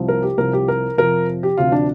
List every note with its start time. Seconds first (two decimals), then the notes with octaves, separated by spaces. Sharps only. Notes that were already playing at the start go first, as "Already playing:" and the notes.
Already playing: C2 C3 F3
0.08 A#4
0.23 G4
0.38 C2 C3 F3 A#4
0.53 G4
0.68 A#4
0.98 F2 C3 F3 A#4
1.43 G4
1.58 D2 C3 F3 F4
1.72 D4